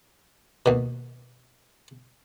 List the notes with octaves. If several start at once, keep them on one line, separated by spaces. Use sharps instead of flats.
D#2 B2